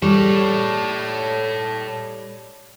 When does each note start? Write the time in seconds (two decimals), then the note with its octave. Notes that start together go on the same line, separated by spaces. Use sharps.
0.02 G3 A4 C#5